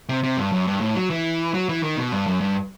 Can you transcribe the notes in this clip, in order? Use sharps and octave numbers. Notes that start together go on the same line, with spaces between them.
C3
C3
G2
F#2
G2
A2
F#3
E3
F#3
E3
D#3
B2
G2
F#2
G2